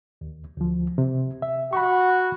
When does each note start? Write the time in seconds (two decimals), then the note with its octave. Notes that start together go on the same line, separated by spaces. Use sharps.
0.21 D#2
0.57 D2 F3
0.98 C3
1.42 E5
1.73 F#4 B5 C#6